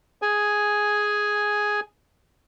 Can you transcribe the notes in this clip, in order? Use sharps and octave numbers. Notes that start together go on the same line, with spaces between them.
G#4 G#5